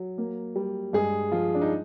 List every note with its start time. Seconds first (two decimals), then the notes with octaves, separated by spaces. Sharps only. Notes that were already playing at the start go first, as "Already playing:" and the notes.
Already playing: F#3
0.18 A#3
0.56 G3
0.93 G2 G#3 G#4
1.32 F3 G#3 F4
1.55 D4
1.62 D#4